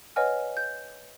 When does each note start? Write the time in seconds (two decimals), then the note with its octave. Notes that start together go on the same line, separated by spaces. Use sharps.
0.16 B4 C#5 D#5 F#5 G#5 F6
0.57 G6